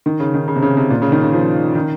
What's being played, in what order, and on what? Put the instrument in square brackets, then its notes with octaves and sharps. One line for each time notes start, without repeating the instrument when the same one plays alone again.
[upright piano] D#3
C#3
D#3
C#3
C3
C#3
C3
A#2
C#3
D#3
C#3
F3
D#3